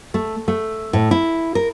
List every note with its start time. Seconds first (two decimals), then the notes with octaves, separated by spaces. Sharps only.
0.14 A3
0.48 A3
0.93 A2
1.11 E4
1.55 A#4